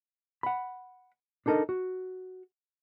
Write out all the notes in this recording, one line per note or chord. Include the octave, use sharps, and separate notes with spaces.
F#5 B5
D4 D#4 A4 A#4 D#5
F#4